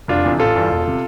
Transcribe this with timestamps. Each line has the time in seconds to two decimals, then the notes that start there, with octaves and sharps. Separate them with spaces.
0.08 F1 D4 F4
0.24 F2 C3 E3
0.39 A1 F4 A4
0.55 G2 E3
0.70 E1
0.88 C3